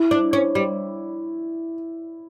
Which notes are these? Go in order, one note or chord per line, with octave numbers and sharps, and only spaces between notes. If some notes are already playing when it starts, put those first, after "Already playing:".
Already playing: E4
D4
C#4
G3